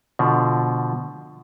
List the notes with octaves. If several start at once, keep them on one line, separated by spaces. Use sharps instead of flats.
B2 D3 F3